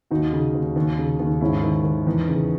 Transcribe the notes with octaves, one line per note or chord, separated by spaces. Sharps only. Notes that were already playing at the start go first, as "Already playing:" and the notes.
D#2 D#4 F#4
C#3
D#2
D#2
C#3
D#2
G#2 C#4 E4
D#3
D#3
E2
C#3